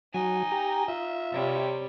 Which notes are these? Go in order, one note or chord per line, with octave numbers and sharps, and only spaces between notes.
F#3 D#4 G#5
G4 A#5
F4 E5
C3 G3 C#5